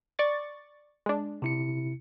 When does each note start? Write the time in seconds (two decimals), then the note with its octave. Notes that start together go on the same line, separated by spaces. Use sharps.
0.19 D5 C#6 A6
1.06 G#3 D4
1.42 C3 E4 C#7